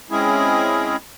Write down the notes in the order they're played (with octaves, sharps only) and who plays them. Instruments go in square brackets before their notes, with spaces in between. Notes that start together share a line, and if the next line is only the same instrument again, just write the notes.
[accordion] G#3 C4 C#4 E4 G#4